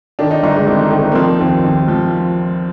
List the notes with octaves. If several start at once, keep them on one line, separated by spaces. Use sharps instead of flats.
D#3 D4
D#4
G1 D#4
G#3
D#3 C4
D#3
A#3
F3 C4
D#2
D#2
F3